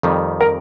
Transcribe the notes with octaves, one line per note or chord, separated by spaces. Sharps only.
F2 D#3 G3
A#4